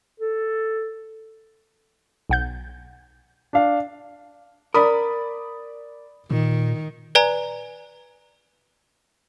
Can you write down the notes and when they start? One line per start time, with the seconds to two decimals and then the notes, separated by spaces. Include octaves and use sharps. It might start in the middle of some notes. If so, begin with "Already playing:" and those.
0.20 A4
2.30 B1 F#5 G6
3.53 D4 F5
4.74 A#4 D5 B5 D#6
6.31 A#2 D#3
7.15 B4 D5 G#5 A#5